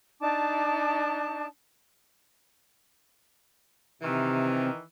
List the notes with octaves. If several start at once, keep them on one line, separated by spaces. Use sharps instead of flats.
D4 D#4 A5 D6
C3 D#3 E3